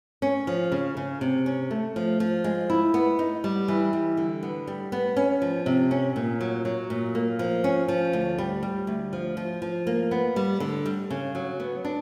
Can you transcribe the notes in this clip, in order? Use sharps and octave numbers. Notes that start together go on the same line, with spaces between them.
C#4
F3
C#3
C#3
C3
C#4
A3
F3
F3
G#3
E4
B3
D#4
G3
E3
G3
D3
B3
G3
B3
C#4
F3
C3
C#4
A#2
F#3
F#3
A#2
A#3
F3
C#4
F3
D2
G3
G3
D2
F3
F3
F3
A#3
B3
G3
D3
G3
C#3
F#3
B3
D4